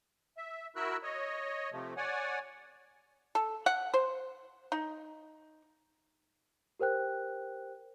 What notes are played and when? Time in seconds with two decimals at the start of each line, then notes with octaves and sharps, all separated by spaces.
0.37 E5
0.76 E4 F#4 A#4 E5 E6 F#6
1.03 C#5 D#5
1.72 C3 F3 A3
1.97 C#5 D5 F#5 G#5
3.35 A4
3.66 F#5
3.94 C5
4.72 D#4
6.80 G4 A#4 C5 G5 F#6